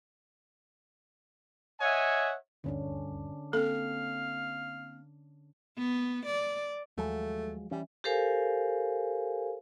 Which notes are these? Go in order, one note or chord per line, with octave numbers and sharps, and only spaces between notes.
C#5 D#5 E5 F#5 G#5
D#1 D2 G2 D3 C#4 D4
A#3 C4 A4 F5
B3
D5
D#2 F3 F#3 G#3 A3
E3 G3 C#4
G4 A4 A#4 C5 F5 G#5